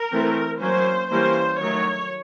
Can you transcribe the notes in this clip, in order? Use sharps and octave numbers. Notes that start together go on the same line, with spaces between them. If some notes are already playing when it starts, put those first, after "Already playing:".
Already playing: A#4
E3 A3 C4
F#3 A#3 C#4 C5
E3 G3 A#3 C#4 C5
D#3 F#3 A3 C#5